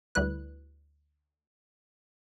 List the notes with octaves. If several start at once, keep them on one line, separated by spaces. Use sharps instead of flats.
D2 G3 E4 B4 F#6